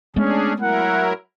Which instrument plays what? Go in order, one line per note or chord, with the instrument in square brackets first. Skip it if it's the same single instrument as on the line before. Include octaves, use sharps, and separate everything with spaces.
[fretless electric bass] G#3 A3 B3 [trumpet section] C#4 [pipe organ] D4 G#4
[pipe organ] F#3 E4 A#4 [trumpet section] F#5